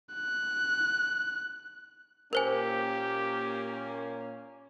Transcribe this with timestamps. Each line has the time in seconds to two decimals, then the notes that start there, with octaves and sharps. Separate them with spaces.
0.15 F#6
2.33 A#2 A#3 C#4 G4 A#4 C5 G#5